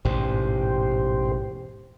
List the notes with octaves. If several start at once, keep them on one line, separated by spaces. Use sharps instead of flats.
E1 A1 G#2 G4 C5